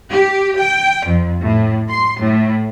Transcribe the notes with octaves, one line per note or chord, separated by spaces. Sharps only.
G4
G5
F2
A2
C6
A2